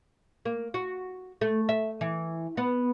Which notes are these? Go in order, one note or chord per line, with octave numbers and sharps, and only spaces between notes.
A#3
F#4
A3
E5
E3
B3